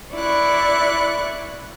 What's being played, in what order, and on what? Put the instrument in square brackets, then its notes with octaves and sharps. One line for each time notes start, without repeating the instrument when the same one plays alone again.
[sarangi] E4 [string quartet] D5 C#6 F#6